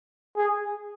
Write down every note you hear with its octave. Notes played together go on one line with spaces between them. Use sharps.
G#4